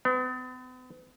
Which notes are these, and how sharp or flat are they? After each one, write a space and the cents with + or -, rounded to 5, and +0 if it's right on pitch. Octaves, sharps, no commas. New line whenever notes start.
B3 +45